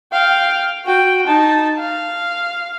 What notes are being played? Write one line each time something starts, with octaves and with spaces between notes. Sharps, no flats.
F5 G5
F#4 G5
D#4 A5
F5